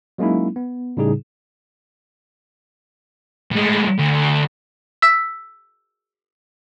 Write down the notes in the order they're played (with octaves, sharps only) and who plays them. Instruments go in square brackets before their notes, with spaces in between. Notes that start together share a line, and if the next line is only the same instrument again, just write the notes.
[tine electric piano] F#3 G#3 A#3 C#4 D#4 E4
B3
A2 C#3 G3 D#4 G#4
[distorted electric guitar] A2 G#3
D2
[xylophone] E6 B6